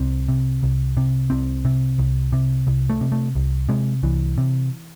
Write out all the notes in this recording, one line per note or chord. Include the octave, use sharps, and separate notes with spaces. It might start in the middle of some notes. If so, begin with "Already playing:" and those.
Already playing: C2 C4
C3
C2
C3
C2 C4
C3
C2
C3
C2
A3
C3
A3
C2
C3 G#3
C2 E3
C3